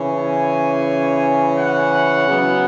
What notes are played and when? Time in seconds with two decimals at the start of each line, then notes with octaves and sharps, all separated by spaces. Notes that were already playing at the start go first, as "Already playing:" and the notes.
Already playing: C#3 E3 C#4
0.16 G#5
1.57 F#5
2.28 C#3 F#3 B3